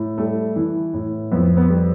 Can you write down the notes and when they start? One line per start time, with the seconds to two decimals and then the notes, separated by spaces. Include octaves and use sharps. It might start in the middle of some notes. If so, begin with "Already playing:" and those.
Already playing: A2
0.18 G3 A3
0.56 E3
0.93 A2
1.32 F2 B3
1.57 B3
1.69 G3